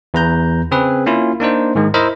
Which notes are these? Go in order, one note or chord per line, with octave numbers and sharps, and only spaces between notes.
E2 B4 A#5 G6
C#3 C4 G#4 B4
A#3 C#4 E4 F4
A#3 D4 D#4 C5
G#2 D#3 G#3
E4 A#4 C5 D#5 E5